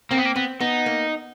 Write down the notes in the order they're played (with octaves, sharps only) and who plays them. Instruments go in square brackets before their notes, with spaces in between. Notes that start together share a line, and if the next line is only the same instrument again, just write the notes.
[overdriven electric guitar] A#3 [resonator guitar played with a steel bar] C4
[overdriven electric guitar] B3
A#3
[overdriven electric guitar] B3 [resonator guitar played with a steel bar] C4
[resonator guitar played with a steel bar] B3 [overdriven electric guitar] D#4
[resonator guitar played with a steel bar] A#3